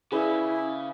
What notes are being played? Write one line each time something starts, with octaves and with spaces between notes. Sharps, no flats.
C#3 E4 G#4 B4 D5